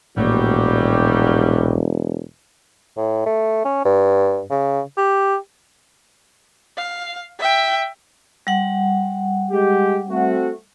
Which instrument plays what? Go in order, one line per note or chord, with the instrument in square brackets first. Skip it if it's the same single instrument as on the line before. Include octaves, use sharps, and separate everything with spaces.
[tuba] E1 [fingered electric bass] A#1 A2 A#3 [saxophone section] F#3 G3
[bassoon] A2
A3
C#4
G2
C#3
G4
[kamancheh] F5
E5 G5
[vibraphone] G3 F#5
[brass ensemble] G#3 G4
A3 C4 F#4